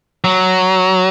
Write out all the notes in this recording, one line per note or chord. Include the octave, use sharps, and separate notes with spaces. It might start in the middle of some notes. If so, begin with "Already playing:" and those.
F#3